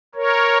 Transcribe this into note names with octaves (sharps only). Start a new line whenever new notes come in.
A#4 C#5